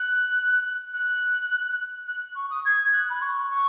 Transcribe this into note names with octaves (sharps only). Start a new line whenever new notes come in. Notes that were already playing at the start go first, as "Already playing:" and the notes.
Already playing: F#6
F#6
F#6
C#6
D#6
G#6
F#6
B5
C#6
C#6